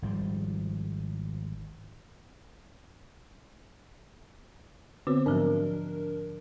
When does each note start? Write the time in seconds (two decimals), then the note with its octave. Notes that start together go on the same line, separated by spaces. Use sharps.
0.02 G#1 F3 G3
5.07 D3 B3 C4 F#4 B4
5.26 G#2 F3 F#3 D4 A#4